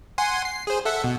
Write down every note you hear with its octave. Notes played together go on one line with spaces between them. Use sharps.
F#5 G#5 C6
C7
G#4 C5
A4 E5 F#5
B2